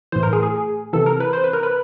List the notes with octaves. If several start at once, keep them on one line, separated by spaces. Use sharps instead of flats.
A2 E3 C5
A#4
G#4
G#4
C3 E3 A4
A#4
B4
C5
B4
A#4
B4